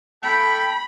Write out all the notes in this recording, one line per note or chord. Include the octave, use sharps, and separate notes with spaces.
A4 G5 B5